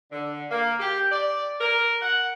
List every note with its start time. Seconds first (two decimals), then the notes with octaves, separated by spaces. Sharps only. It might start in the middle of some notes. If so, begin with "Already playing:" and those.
0.11 D3
0.50 A#3
0.80 G4
1.11 D5
1.60 A#4
2.02 F#5